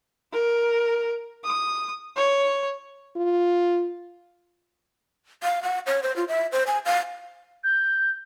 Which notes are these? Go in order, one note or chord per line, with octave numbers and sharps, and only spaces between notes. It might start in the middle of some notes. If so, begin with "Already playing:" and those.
A#4
D#6
C#5
F4
F5
F#5
C#5
C5
F4
E5
C5
G#5
F5
G6